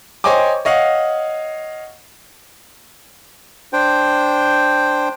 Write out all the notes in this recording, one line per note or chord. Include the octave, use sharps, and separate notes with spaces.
C5 C#5 D#5 G5 G#5 D6
C#5 D#5 F5 F#5
D4 C5 G5